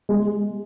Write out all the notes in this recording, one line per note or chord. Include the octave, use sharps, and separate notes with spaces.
G#3